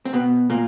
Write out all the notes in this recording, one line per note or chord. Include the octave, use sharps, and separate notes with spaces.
C4
B2 B3
A#2 A#3